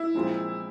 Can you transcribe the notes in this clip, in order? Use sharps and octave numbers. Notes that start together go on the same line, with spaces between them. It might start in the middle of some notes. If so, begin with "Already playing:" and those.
Already playing: E4
A#1 A#2 G#3 C4 F4